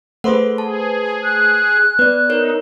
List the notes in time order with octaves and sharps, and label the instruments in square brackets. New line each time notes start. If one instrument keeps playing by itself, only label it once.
[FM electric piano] A3 B4 C5 [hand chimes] G#4 A4 F#5
[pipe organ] G#4 [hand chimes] A5
[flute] F#6
[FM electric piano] B3 [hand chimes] B4 D5
[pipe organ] D#4 [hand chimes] A#4 C#5